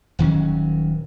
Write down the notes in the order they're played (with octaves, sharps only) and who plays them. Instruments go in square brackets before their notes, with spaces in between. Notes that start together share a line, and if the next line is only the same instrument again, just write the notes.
[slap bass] D#1 D#3 F#3 C#4